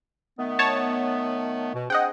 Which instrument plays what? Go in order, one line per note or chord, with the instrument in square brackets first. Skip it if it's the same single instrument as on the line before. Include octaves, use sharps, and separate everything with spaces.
[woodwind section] D#3 A3 B3
[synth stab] C#5 A5
[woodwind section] B2
[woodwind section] C4 D4 G#4 [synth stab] D#5 F#5 G5